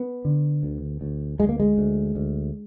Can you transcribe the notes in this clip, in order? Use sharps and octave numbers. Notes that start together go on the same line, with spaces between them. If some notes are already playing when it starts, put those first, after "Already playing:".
Already playing: B3
D3
D2
D2
D2 G#3
A#3
G#3
D2
D2